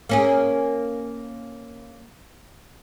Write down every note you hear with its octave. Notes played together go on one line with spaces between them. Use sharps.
A#3 C#4 G#4